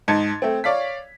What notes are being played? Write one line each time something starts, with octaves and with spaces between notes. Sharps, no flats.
G#2 D#4 A5 G#6 A6 C#7
A3 C4
C#5 D5 F5 B6